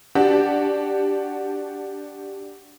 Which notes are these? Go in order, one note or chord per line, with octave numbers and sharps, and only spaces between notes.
D4 F#4 G4